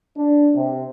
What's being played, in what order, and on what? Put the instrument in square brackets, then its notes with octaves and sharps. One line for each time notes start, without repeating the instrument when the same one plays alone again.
[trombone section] D4
C3